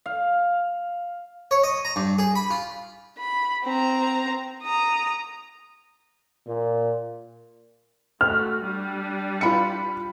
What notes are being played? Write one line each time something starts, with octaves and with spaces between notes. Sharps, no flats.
F5
C#5
D#5
A#5
G2
G#4
B5
F4
B5
C4 A#5
A#5 D#6
A#2
A3 F#4 F6
G3 D4
F4 B5 C#7